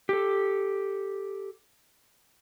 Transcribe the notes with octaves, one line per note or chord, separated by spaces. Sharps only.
G4 A4